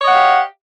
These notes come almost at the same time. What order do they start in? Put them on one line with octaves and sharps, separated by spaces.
C#5 D#5 F#5 F5 G4